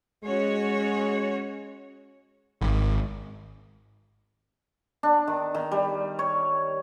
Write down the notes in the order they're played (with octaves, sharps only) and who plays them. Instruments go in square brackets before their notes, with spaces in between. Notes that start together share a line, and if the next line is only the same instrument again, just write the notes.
[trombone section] G#3 [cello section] C#4 F#4 C#5
[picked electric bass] G#1
[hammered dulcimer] D4
D#3
D#3
G3
C#5